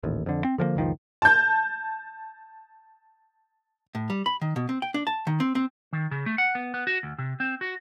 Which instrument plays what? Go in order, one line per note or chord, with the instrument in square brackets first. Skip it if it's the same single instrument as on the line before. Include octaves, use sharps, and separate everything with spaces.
[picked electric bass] D#1 A1 D#2
F2 D3
C4
D3 F3 G3 A#3
F#1 C#2 D#3 F3
[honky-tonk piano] A5 G6
[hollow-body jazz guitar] A2
G3
B5
D#3
B2
C4
G5
D4
A5
D#3
C4
C4
[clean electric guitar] D#3
C#3
A3
F#5
B3
B3
F#4
D2
C3
C4
F#4